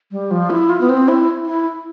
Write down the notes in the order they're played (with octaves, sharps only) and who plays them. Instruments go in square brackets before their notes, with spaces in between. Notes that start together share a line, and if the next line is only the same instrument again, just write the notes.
[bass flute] G3
F3
E4
F4
B3
C4
E4
E4